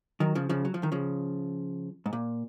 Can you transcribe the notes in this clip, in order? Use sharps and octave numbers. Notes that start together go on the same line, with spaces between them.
D#3 F#3
C#3 F3
C#3 F3
F#3
F3
D#3
C#3 F3
G#2
A#2